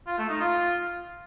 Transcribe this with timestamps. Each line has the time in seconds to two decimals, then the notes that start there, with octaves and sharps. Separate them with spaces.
0.07 F4
0.18 A3
0.30 D#4
0.41 F4